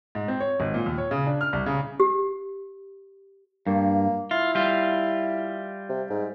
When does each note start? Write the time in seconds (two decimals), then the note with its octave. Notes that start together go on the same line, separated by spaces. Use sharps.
0.15 G#2
0.28 C4
0.40 C#5
0.60 G#1
0.74 A#2
0.86 D#2
0.98 C#5
1.11 C#3
1.26 D4
1.41 F6
1.53 C2
1.66 C#3
2.00 G4
3.67 G2 A#3
4.31 E4 F4
4.55 G3 F4
5.89 C3
6.10 G#2